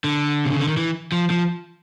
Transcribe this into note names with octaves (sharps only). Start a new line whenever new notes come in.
D3
C3
C#3
D3
D#3
E3
F3
F3